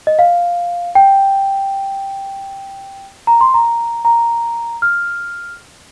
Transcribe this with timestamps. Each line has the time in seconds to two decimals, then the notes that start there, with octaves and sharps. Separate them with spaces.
0.07 D#5
0.19 F5
0.95 G5
3.27 A#5
3.41 C6
3.54 A#5
4.05 A#5
4.82 F6